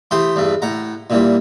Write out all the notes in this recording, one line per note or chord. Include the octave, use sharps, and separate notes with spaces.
E3 A3 G4 C5 D#6
E2 G2 A3
A2 F#5 A#5
A#2 E3 G3